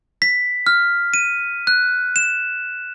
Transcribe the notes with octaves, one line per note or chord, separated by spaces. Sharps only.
B6
F6
D#7
F#6
E7